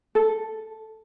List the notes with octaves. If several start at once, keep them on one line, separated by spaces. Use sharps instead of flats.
A4